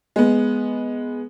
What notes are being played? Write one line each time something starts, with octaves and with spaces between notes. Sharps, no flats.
G#3 B3